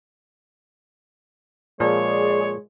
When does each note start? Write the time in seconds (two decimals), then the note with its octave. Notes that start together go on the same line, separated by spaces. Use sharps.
1.80 A#2 F3 G#3 G#4 C#5 D5